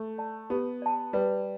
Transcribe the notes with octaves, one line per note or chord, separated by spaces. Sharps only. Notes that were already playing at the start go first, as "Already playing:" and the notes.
Already playing: A3
D5 A5
B3 G4
D5 A5
G3 B4